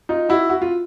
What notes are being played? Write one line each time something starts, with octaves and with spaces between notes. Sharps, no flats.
D#4 F4
E4 F#4
F#4
F4